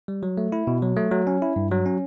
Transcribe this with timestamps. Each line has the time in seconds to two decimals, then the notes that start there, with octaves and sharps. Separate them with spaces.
0.08 G3
0.23 F#3
0.38 A3
0.52 E4
0.67 B2
0.82 F#3
0.97 A3
1.11 F#3
1.27 C#4
1.42 E4
1.56 G2
1.72 F#3
1.86 C#4